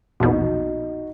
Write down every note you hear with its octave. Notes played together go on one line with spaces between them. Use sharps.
A#1 E2 B2 D#4 F#4